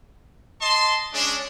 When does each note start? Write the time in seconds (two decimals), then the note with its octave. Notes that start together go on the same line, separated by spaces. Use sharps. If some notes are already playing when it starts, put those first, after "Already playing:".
0.62 D#5 A5 C6
1.14 G#3 C#4 D4